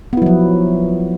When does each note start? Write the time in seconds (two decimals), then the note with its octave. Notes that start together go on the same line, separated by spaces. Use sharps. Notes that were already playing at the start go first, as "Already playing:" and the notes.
0.13 B3
0.17 E4
0.22 F#3
0.26 F3